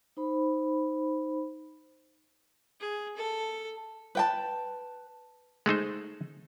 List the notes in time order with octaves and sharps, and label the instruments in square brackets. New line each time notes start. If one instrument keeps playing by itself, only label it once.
[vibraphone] D#4 C5 B5
[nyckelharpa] G#4
A4
[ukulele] B4 G5 A5
[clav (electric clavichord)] G#3 A3 D#4 C5